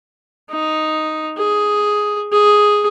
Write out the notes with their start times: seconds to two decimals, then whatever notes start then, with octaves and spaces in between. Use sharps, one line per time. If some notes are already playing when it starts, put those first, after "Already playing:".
0.50 D#4
1.37 G#4
2.33 G#4